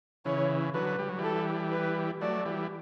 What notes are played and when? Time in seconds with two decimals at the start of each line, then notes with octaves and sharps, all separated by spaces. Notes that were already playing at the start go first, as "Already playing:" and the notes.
0.25 C#3 E3 C#5
0.74 D3 F#3 B4
0.99 G3
1.09 F#3
1.19 E3 G3 A4
1.72 B4
2.21 F#3 A3 D5
2.45 E3 G3